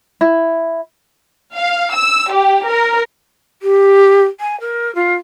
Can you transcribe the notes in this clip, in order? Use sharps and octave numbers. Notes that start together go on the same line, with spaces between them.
E4
F5
E6
G4
A#4
G4
G#5
A#4
F4